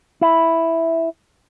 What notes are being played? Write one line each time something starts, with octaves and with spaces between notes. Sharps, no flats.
E4